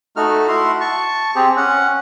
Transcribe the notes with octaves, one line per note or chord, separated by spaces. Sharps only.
A3 D#4 F#4 F6
E4 F#4 C6
A5 C#6
C4 G4 G#4
C#4 F#5